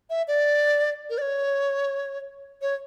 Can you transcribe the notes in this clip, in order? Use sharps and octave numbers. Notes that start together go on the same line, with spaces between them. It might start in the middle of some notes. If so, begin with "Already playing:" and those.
E5
D5
A#4
D5
C#5
C#5